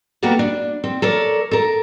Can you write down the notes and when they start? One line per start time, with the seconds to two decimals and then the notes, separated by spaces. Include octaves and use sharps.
0.22 A#3 B3 F#4 G4 A4 D5
0.39 D4
0.84 C4
1.02 A4 A#4 C#5 D5
1.51 A4 A#4